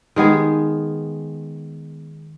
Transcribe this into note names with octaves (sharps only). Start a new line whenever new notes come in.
D#3 G#3 B3 G#4